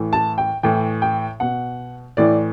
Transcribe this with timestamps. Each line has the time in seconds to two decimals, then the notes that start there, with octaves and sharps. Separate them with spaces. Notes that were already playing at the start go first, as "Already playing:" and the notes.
Already playing: A2 E3
0.13 A5
0.38 G5
0.63 A2 E3 G5
1.02 G5
1.40 B2 F#5
2.17 A2 E3 D5